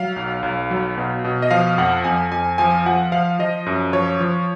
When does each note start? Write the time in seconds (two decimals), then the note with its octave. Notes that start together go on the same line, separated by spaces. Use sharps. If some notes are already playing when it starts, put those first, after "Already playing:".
Already playing: F#3 F5
0.16 B1
0.43 B1
0.71 F#3
0.98 B2
1.24 B2
1.42 D#5
1.51 F3 F5
1.78 F2 F#5
2.04 F2 G#5
2.32 F2 G#5
2.58 F3 G#5
2.86 F3 F#5
3.12 F3 F5
3.39 F3 D#5
3.66 F#2
3.93 F3 C#5
4.20 F3